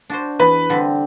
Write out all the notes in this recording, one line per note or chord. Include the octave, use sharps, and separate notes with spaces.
D4 F#4 C5
E2 B4
D3 G3 C4